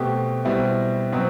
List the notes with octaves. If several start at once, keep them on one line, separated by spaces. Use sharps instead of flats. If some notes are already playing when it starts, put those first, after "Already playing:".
Already playing: B2 A3 C4 G4
B2 G3 C4 E4
B2 F#3 C4